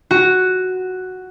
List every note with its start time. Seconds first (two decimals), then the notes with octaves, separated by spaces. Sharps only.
0.11 F#4